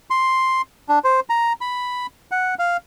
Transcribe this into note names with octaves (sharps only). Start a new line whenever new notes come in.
C6
D4
C5
A#5
B5
F#5
F5